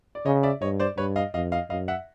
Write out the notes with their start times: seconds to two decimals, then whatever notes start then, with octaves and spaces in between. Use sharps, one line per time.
0.15 D5
0.25 C#3 C#5 D#5
0.43 D5 E5
0.61 G2 C#5 D#5
0.80 C5 D5
0.97 G2 B4 C#5
1.16 D#5 F5
1.34 F2 D#5 F5
1.52 D#5 F5
1.70 F#2 D#5 F5
1.88 E5 F#5